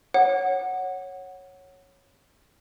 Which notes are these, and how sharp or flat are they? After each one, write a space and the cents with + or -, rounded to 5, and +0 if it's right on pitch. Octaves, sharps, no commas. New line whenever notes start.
C#5 -10 F#5 +0